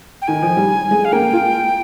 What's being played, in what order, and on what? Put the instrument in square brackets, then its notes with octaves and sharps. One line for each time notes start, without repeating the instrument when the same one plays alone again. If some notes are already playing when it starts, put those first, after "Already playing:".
[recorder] G5
[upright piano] D#3 [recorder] G#5
[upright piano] F3
G3
G#3
[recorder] F5
[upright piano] A#3 [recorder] G5
[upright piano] F4